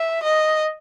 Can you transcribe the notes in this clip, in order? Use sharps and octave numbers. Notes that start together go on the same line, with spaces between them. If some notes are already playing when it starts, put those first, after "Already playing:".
Already playing: E5
D#5